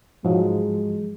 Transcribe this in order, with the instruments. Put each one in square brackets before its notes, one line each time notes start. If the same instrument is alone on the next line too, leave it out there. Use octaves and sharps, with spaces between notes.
[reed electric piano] G#2 F3 F#3 [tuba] G#3